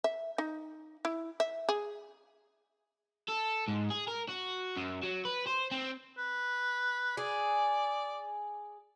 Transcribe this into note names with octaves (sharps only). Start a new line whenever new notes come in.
E5
D#4
E4
E5
G#4
A4
G#2
G#4
A#4
F#4
F#2
F#3
B4
C5
C4
B4
G#4 D5